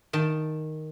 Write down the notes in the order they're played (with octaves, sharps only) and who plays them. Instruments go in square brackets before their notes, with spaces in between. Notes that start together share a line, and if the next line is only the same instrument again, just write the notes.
[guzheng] D#3 A5